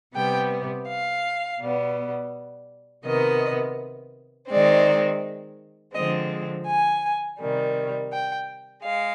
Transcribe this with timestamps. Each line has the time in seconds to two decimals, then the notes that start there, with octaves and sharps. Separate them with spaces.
0.15 C3 G3 B3 G5
0.87 F5
1.60 B2 G3 B3
3.05 C3 D#3 B3 D#5
4.49 D#3 G#3 C4 D5
5.94 D3 F3 G#3 C4 D#5
6.67 G#5
7.39 C3 D#3 G3
8.12 G5
8.83 G#3 F5